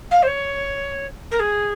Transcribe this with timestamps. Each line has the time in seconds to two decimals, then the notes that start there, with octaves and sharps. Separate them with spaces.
0.11 F5
0.22 C5
0.27 C#5
1.31 A#4
1.39 G#4